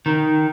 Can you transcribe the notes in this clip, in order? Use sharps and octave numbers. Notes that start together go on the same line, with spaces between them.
D#3